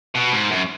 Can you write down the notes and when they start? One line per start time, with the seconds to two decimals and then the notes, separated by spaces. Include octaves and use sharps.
0.15 B2
0.33 G#2
0.51 F#2